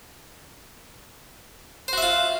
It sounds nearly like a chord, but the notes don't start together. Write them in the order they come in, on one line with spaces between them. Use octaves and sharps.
C5 F#4 E5 F4